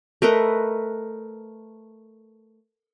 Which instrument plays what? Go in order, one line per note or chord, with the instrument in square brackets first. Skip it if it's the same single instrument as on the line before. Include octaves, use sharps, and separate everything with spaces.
[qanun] A3 A#4 B4 D#5